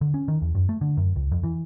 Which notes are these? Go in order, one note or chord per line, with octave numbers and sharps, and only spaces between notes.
D3
C#4
D#3
E2
F#2
A3
D3
F#2
C#2
F2
E3